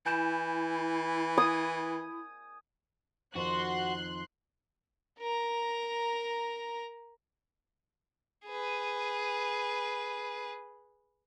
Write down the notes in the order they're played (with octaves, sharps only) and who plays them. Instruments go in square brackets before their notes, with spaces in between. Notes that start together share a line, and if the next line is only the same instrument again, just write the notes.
[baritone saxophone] E3 [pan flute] E4 [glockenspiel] G#5 G6 E7
[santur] D#6 [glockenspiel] G#6
[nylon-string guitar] F2 D#3 F3 [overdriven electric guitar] F#4 [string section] C6 F#6
[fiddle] A#4 A#5
G#4 B4